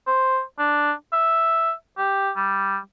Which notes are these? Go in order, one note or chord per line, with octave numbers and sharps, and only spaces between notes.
C5
D4
E5
G4
G3